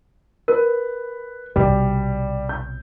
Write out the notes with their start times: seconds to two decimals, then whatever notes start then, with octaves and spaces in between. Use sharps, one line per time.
0.48 A#4 B4
1.56 B1 C3 G3
2.49 G6